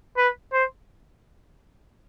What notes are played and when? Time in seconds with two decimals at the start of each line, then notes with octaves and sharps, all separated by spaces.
0.17 B4
0.53 C5